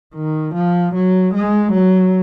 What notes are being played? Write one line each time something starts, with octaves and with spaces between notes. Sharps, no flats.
D#3
F3
F#3
G#3
F#3